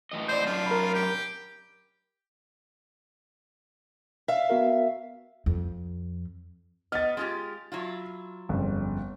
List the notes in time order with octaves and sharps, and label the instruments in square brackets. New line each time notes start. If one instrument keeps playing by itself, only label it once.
[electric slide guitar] A2 E3 D#5
[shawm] C5 [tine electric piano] D5 G6
[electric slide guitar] F#2 D4 [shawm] F4
[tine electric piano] A#4 B5
[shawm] G4
[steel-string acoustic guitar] E5 F5
[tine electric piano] B3 F#4 A#4
[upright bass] F2
[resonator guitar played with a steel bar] B3 D#5 [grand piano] F6 A6
[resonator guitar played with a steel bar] G#3 F4 G4
F#3 E4 F4
[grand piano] G1 F2 C#3